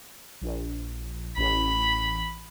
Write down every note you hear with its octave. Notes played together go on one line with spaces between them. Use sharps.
A#1
A1 B5